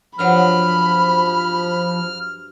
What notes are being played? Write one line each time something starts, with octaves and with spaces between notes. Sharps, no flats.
G2 F3 F#3 F#4 B5 F6